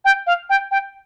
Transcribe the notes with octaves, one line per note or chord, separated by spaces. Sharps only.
G5
F5
G5
G5